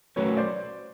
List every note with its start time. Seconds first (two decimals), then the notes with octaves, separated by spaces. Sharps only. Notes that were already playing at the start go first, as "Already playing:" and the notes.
0.16 F#3 A3 C#4 F#4 A#4 B4 C#5
0.37 C5 D5